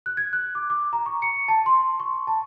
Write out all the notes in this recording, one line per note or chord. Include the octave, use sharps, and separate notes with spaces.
F#6
G#6
F#6
D6
D6
A#5
C#6
C#7
A5
C6
C#6
A5